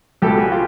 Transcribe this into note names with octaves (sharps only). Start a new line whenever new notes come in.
C#2 B2 G4 A4
F#4 G#4
F4 G4